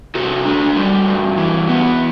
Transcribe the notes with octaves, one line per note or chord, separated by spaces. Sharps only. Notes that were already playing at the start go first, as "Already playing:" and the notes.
C3 F#4 A4
D4
G3
G2
E3
B3